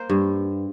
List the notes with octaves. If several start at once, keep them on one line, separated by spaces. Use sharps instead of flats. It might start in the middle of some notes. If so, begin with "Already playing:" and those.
Already playing: A#3 C5
G2